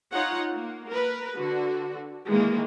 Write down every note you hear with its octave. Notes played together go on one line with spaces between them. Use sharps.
D#4 F4 C#5 F#5
A#3
A#4 B4
D3 F#4
D#3 E3 G#3 A#3